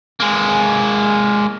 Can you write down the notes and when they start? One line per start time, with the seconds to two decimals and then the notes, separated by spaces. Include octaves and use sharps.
0.20 G#3 A#3